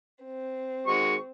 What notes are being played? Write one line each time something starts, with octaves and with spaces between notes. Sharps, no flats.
C4
D#3 G#3 F#4 C#6